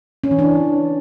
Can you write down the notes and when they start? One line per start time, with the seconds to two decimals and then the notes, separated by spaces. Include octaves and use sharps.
0.24 C#4
0.31 E3
0.39 D4